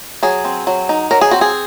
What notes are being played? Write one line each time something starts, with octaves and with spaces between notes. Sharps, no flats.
F#3 G#4
C4
F#3
D#4
F#3 A#4
G#4
C4 F#4
G#4